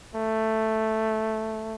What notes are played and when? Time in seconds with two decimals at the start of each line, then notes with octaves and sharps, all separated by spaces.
0.15 A3